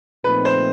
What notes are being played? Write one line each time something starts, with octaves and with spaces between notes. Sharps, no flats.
A#2 F3 A3 C4 D#4 B4
C5